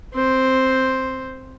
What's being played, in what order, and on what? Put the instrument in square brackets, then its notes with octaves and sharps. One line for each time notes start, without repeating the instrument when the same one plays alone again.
[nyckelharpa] C4 C5